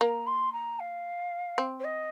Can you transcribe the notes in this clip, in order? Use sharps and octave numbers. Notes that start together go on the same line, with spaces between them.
A#3 A#5
C6
A#5
F5
C4
C5
D#5